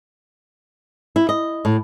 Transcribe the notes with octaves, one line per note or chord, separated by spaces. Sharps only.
E4
D#5
A2